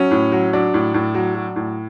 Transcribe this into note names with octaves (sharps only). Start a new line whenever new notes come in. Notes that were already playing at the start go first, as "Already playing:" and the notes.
Already playing: F#3 C#4
A2
F#3
F#3 D4
A2
A2
F#3
F#3
A2